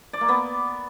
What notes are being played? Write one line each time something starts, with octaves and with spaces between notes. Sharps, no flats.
D5
A#3
B3